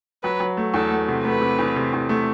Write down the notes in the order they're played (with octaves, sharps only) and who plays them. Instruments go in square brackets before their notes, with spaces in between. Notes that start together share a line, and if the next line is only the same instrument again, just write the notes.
[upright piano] F#3 [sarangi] B4
[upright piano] F#3
A3
[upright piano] E2 [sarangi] A4
[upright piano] A3
C3
[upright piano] A3 [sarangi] B4
[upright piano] C3
E2
C3
E2
A3